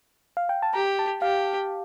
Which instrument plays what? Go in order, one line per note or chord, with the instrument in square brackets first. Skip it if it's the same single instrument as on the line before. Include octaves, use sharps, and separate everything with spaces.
[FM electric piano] F5
G5
A5
[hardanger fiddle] G4 [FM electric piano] A#5
[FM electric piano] A5
[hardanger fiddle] G4 [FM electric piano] F5